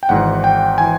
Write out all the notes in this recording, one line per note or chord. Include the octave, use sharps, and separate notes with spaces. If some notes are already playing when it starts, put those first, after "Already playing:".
G5
G#1 G#2 E3 F#5
G5
E3 G#5